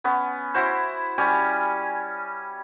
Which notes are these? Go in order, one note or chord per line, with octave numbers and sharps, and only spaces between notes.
B3 C#4
E4 F#4 C5
G3 C#4 G#5